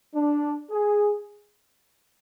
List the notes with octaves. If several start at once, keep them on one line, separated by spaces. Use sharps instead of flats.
D4
G#4